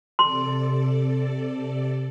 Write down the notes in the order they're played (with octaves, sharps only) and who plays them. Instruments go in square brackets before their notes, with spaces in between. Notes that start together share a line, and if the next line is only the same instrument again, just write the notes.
[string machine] C3 A4 D5 [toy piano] C6